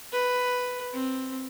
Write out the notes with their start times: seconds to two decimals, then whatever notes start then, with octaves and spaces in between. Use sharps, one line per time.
0.12 B4
0.93 C4